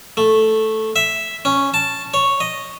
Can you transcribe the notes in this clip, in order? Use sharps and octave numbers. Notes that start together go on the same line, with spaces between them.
A3
E5
C#4
A5
C#5
D#5